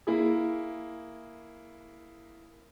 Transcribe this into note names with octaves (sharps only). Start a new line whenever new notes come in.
A#3 E4 G#4